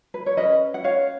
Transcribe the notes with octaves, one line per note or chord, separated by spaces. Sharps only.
B4
C#5
C#4 B4 D#5
F#5
B4 C#5 F5